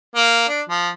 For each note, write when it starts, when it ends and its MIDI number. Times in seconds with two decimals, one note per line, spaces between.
0.16 0.45 58
0.48 0.61 62
0.70 0.89 53